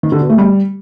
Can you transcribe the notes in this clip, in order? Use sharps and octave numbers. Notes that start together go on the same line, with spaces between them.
D#3
D3
B2
A3
G3